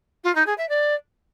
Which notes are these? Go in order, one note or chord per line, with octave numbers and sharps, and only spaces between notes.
F4
D#4
G#4
E5
D5